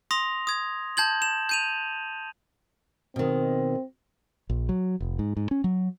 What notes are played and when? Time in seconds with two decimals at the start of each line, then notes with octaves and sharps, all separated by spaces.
0.11 C6 D#6 A#6 F7
0.47 D#6 G#6
0.97 A5 G6 G#6 F#7
1.22 E7
1.49 G6 D#7 F7
3.16 B2 D#3 C4
4.50 A#1
4.69 F#3
5.00 F1
5.19 G#2
5.37 G#2
5.51 C#4
5.64 F#3